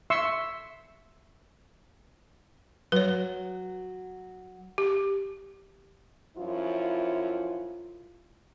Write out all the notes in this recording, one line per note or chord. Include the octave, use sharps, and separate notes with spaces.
E5 C6 C#6 E6
F#3 B4 C#5
G4
F#2 F3 E4 F4